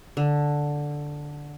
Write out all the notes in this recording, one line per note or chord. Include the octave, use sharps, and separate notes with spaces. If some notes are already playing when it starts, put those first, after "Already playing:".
D3